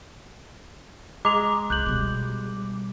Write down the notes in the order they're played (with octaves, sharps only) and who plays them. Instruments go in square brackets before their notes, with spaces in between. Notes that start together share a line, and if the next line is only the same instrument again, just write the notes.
[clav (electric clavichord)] G#3 [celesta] A#5 F7 [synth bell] D6
[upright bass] C2 [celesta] F#6 G6 F#7
[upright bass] B2 G3